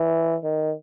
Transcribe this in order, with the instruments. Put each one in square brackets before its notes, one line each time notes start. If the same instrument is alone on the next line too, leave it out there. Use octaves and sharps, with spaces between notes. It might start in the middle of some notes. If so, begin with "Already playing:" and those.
Already playing: [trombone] E3
D#3